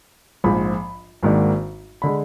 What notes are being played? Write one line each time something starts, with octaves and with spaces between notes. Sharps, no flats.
A#1 G#2 F3 B5
G#1 G#2 D#3 A#3 D4
D3 G#3 B5